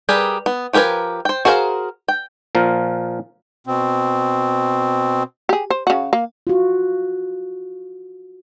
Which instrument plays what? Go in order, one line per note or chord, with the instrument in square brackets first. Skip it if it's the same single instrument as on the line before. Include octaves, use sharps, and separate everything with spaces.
[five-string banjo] G3 G4 G#4 A#4 B4
B3
F3 G4 A#4 B4 G#5
C5 G5
F#4 G#4 A#4 C5 F5
G5
[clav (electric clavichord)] A#2 F3 A#4
[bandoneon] B2 C4
[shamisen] G4 G#4
C5
C#3 F#4
A#3
[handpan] F4 F#4